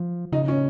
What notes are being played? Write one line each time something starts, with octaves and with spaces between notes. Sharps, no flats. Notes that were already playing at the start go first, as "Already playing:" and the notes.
Already playing: F3
C#3 D#4
C#4